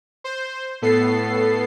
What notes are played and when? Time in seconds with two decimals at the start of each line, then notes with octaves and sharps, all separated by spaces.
0.24 C5
0.82 A2 B3 A4 C7